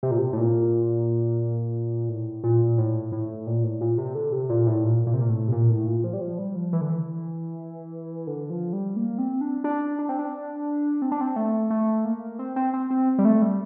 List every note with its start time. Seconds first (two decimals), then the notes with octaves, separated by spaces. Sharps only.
0.03 C3
0.11 A#2
0.19 C3
0.33 A2
0.38 A#2
2.09 A2
2.44 A#2
2.78 A2
3.12 A2
3.46 A#2
3.64 A2
3.81 A#2
3.98 C3
4.15 D3
4.32 C3
4.50 A#2
4.67 A2
4.84 A#2
5.07 A#2
5.13 C3
5.21 A#2
5.29 A2
5.48 C3
5.52 A#2
5.70 A2
5.87 A#2
6.04 F3
6.13 G3
6.21 F3
6.39 G3
6.56 F3
6.73 E3
6.81 D3
6.90 E3
8.27 D3
8.50 F3
8.73 G3
8.96 A#3
9.18 C4
9.41 D4
9.64 D4
9.99 D4
10.09 C4
10.19 D4
11.02 C4
11.11 D4
11.21 C4
11.36 A3
11.70 A3
12.05 A#3
12.39 C4
12.56 C4
12.74 C4
12.90 C4
13.19 G3
13.25 A3
13.42 G3